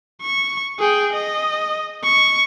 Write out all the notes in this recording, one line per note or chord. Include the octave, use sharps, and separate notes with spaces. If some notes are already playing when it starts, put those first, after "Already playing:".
C#6
G#4 G5
D#5
C#6